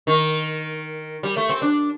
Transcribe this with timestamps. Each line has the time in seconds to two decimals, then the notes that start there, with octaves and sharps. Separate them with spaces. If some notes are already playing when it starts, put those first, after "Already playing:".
0.07 D#3
1.23 G3
1.36 A3
1.49 C4
1.62 D4